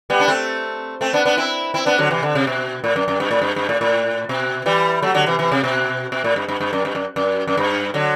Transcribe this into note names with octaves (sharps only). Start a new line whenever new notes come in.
G3 B3
D4
A3 C4
A3 C4
B3 D4
B3 D4
C4 E4
C4 E4
B3 D4
D3 F#3
C3 E3
D3
C3
B2
A2
F#2
F#2
G2
A2
G2
G2
A2
A2
B2
E3 G3
F#3 A3
D3 F#3
C3 E3
C3 E3
C3
B2
B2
A2
G2
G2
G2
F#2
G2
F#2
F#2
F#2
G2
D3 F#3